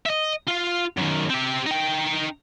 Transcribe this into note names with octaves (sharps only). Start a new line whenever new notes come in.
D#5 E5
F4 F5
F#2 D#3
C4 G4
D#4 G5